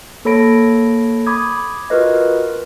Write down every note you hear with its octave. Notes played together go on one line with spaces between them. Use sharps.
A#3 A4 C#5 B5 A#6 D7
B5 D6 D#6 G#6
F4 F#4 A#4 B4 D#5